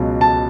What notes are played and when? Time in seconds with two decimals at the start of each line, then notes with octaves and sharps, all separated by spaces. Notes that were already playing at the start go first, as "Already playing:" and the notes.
Already playing: C#2 B2 F#3
0.21 A5